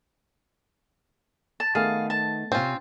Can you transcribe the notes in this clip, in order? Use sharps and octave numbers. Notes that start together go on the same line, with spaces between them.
A5
D#3 A3 B3 G#4 F5 A5
A5
C3 C4 C#4 F4